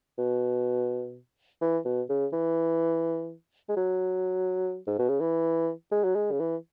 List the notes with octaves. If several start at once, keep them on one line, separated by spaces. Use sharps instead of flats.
B2
E3
B2
C#3
E3
G#3
F#3
G#2
B2
C#3
E3
G#3
F#3
G#3
C#3
E3